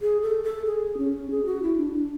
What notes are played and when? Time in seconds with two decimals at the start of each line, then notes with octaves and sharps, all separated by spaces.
0.02 G#4
0.22 A4
0.43 A4
0.65 G#4
0.98 C#4
1.30 G#4
1.46 F#4
1.63 E4
1.78 D4
1.94 D4